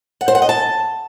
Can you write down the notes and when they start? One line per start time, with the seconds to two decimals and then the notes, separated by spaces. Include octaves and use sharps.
0.21 F#5
0.28 C5
0.35 F#5
0.42 D#5
0.49 A5